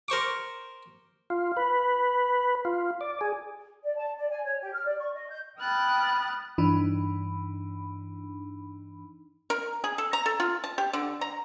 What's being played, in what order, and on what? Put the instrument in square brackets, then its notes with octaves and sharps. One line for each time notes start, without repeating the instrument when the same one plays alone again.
[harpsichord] A#4 C5 C#6 D6
[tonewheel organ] F4
B4
F4
D5
G#4
[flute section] D5
A5
D5
G#5
C#5
G4
F6
D5
C#6
D#5
G6
[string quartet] G5 B5 D#6 F6 F#6 A6
[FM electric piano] G2 E3 D4 D#4 B5
[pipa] A#4
G#4
A4
A#5
A4
F4
A5
G4
D3
A#5